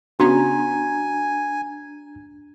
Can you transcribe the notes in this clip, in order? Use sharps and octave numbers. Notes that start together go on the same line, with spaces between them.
C#3 B3 C#4 D4 F#4 G#5 A#5